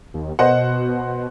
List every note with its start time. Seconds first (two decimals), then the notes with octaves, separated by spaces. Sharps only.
0.14 D#2
0.39 B2 C5 D#5 F#5